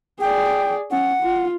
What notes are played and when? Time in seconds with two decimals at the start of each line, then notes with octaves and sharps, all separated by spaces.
0.21 G#4 D5 G5
0.91 C#4 F#5
1.23 F4